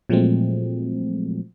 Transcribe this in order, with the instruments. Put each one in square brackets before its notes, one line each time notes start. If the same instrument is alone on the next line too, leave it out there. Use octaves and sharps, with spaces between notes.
[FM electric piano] A#2 F3 F#3 G#3 A3 C4